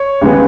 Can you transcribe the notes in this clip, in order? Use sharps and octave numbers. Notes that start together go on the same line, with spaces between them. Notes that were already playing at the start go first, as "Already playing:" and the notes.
Already playing: C#5
D#2 C#3 G#3 B3